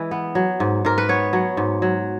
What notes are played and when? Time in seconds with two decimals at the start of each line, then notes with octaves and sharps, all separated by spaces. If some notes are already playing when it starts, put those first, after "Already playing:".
Already playing: E3 G#3 B4
0.11 B3
0.35 F#3
0.60 G#2
0.85 G#2 A#4
0.98 B4
1.09 B3 C#5
1.33 F#3
1.57 G#2
1.82 F#3